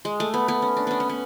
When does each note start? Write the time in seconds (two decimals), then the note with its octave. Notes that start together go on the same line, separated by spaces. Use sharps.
0.05 G#3
0.20 A3
0.34 B3
0.48 B3
0.62 C#4
0.77 D4
0.87 B3 C#4
1.00 C#4
1.09 B3